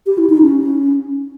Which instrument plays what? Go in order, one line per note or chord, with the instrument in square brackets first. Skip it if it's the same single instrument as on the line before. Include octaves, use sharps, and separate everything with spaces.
[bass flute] G4
E4
D#4
C#4